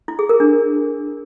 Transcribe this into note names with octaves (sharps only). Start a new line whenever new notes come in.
E4
G#4
A#4
D4